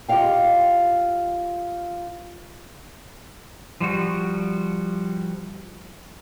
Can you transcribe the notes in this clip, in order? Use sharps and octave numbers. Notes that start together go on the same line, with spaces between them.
F4 G4 B4 D#5 F5 G5
F3 G3 F#4